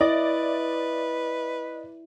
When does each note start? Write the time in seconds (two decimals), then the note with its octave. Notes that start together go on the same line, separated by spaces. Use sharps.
0.01 E4 B4 D5 D#5